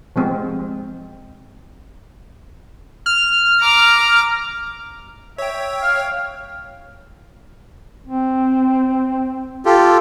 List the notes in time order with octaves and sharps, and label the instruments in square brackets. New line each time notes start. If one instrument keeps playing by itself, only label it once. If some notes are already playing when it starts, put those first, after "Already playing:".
[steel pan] F3 G#3 C4
[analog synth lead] F6
[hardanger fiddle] A#5 D6
[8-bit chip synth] C#5 G5 [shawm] E5
[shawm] F5 [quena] F6
[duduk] C4
[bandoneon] F4 G4 A4